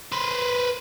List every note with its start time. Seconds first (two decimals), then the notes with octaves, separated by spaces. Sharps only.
0.12 B4 C5